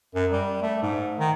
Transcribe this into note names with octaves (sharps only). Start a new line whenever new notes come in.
F#2
G3
A3
G#2
D#3